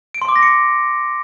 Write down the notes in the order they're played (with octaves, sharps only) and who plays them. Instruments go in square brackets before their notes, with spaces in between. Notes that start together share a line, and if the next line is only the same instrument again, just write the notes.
[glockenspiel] D7
C6
D6
A#6
C#7